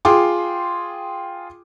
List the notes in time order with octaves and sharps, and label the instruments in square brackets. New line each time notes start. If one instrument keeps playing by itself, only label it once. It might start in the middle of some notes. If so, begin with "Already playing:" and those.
[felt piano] F4 G#4 G5 C6 D6